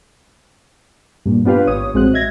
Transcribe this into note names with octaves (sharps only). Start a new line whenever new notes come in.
G2 A#2
B3 D4 F4 G4 B4 F5
G#1 C#5 D#6
A#1 G#3 C4 F#4 F#6
D#5 E5 G#6 A#6